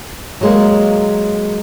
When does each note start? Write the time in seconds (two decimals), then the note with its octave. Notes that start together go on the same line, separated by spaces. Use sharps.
0.41 F#3 G#3 A#3